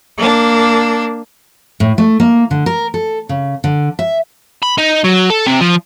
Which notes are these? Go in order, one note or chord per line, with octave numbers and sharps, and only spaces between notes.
A#3 D4
A2
A3
A#3
D3
A#4
A4
C#3
D3
E5
B5
D#4
F#3
A4
C3
F3